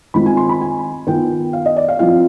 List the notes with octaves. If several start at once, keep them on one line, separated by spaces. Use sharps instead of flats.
D#3 G#3 C4 F4 B5
G#5
C6
B5
G#5
D#3 B3 F4 G5
F5
D#5
D5
F5
F3 C4 F4 F5